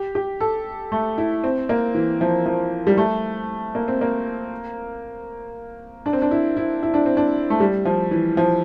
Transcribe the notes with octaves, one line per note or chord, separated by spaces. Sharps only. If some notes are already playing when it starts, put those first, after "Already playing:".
Already playing: G4
G4
A4
A3
E4
C4
A#3
E3
F3
F3
G3
A3
A#3
C4
A#3
D4
C4
D4
E4
E4
E4
D4
C4
D4
A3
G3
F3
E3
F3